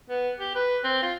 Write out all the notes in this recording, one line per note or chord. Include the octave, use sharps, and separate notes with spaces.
B3
G4
B4
C4
F4